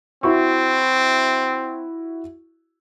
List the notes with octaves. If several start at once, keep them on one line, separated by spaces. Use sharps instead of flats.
C4 E4 F#4 C#6